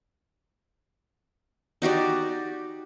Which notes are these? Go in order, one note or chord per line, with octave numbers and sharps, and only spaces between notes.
D#4 F#4 G4 D5